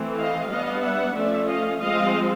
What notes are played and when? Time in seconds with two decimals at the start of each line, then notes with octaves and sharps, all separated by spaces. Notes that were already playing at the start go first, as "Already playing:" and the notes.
Already playing: E3 A3 C4
0.18 D#5 F5
0.50 G3 B3 D4 D#5 F5
0.83 E5 F#5
1.16 F3 A3 C#4 D5 E5
1.48 D#5 F5
1.81 F3 G#3 C4 D#5 F5